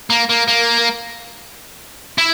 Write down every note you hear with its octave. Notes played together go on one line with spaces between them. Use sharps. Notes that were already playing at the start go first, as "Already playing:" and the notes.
A#3
A#3
A#3
E4